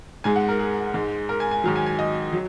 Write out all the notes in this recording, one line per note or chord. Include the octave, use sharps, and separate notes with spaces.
G#2 G#3 G#5
F#5
A#4
G#4
G#2 G#3
A#4
G#5
G#5
G#2 D#3 F#3
G#5
G#5
D#5
F#3